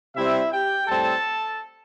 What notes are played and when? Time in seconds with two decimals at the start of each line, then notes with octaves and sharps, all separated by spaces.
0.16 C3 G3 C4 E4 E5
0.52 G4 G5
0.88 A2 G3 C4 A4 A5